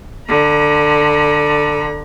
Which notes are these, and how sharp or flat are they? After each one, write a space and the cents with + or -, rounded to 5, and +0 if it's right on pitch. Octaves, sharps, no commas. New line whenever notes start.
D3 +15 A#5 +45